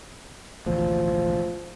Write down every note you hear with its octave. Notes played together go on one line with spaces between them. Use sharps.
E1 A1 D2 F3